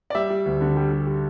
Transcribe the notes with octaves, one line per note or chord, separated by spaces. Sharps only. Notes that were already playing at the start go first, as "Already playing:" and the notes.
D5
G3 E5
G3
D2
D3
G3
G3
G3